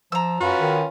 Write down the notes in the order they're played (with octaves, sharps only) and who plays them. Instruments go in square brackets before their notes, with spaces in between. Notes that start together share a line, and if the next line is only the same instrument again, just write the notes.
[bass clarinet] F3 [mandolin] A#5 E6
[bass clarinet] F#2 [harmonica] C#4 F4 B4 [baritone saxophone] F#4
[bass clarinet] D#3